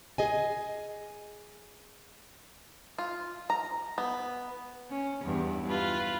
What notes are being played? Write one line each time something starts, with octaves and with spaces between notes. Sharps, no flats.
G#4 D#5 G#5
F4
A#5
B3
C#4
E2 G2 E3
F4 B4